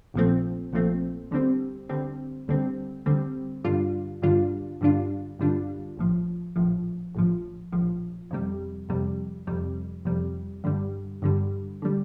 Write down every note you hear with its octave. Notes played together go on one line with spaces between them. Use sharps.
A#1 A#2 F3 A3 C4
A#1 A#2 F3 A3 C4
D2 D3 G3 C4
D2 D3 G3 C4
D2 D3 G3 C4
D2 D3 G3 C4
G2 D3 G3 D4 F4
G2 D3 G3 D4 F4
G2 D3 G3 D4 F4
G2 D3 G3 D4 F4
A#1 A2 F3
A#1 A2 F3
A#1 A2 F3
A#1 A2 F3
F2 C3 G3
F2 C3 G3
F2 C3 G3
F2 C3 G3
G2 D3 G3
G2 D3 G3
D3 G3